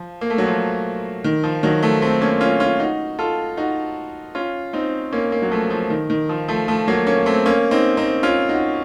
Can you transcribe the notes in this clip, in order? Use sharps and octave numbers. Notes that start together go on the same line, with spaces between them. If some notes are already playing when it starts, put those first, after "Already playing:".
Already playing: F3
A#3
A3
F#3
F3
D#3
F3
D#3 F#3
F3 A3
A3 C4
A#3 C#4
C#4 F4
C#4 F4
D#4 F#4
F4 A4
D#4 F#4
C#4 F4
C4 D#4
A#3 C#4
A#3 C#4
F#3
F3 A3
F3
D#3
D#3
F3
F3 A3
F3 A3
F#3 A#3
A#3 C#4
A3 C4
A#3 C#4
C4 D#4
C4 D#4
C#4 F4
D#4 F#4